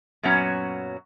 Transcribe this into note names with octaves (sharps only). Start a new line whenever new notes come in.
F#2 A#2 F#3 B3 C#4 F#4